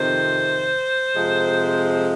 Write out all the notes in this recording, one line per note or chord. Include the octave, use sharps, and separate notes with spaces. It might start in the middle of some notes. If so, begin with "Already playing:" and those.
Already playing: F2 C3 D#3 C5
F2 C3 F3 G#3